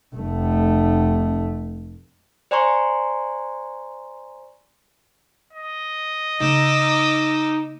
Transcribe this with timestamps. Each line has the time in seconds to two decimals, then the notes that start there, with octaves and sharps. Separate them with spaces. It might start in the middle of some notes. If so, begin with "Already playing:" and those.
0.15 F1 A3
2.51 C5 D5 G#5 A#5 C6 C#6
5.53 D#5
6.40 C#3 A#3 D#4 D6 E6